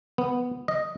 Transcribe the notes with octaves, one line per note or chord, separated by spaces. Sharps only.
B3
D#5